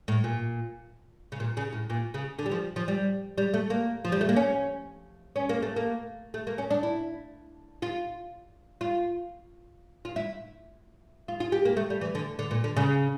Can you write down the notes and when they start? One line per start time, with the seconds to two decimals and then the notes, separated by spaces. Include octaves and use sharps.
0.08 A2
0.24 A#2
1.32 C#3
1.40 A#2
1.57 C#3
1.72 A2
1.90 A#2
2.14 C#3
2.39 D3
2.46 G3
2.51 F3
2.76 F3
2.88 G3
3.38 G3
3.54 A3
3.70 A#3
4.05 F3
4.12 G3
4.21 A3
4.29 A#3
4.36 C#4
5.36 C#4
5.49 A#3
5.62 A3
5.76 A#3
6.34 A3
6.47 A#3
6.58 C#4
6.71 D4
6.83 E4
7.82 F4
8.81 F4
10.05 F4
10.16 E4
11.28 F4
11.40 F4
11.52 G4
11.65 A#3
11.77 A3
11.90 G3
12.01 E3
12.15 D3
12.39 D3
12.51 A#2
12.64 D3
12.77 C#3